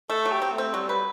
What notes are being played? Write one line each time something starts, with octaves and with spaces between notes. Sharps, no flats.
A3 A4
F#3
G4
C4
A3
C4
F#3 G3
B4